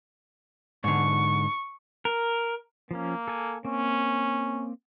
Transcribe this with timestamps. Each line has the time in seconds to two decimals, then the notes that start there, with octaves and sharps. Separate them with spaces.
0.84 G#2 D3 C#6
2.05 A#4
2.91 F3 A#3 C#4
3.28 A4 G#5
3.65 A#3 C4 C#4